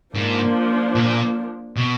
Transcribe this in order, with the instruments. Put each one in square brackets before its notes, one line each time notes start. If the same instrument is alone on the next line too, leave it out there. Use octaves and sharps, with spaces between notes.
[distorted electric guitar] G#2 [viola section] F3 A#3 D4
[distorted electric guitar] A#2
B2